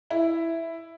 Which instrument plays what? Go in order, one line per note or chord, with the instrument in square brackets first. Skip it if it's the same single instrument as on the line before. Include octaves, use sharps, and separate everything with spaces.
[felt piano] E4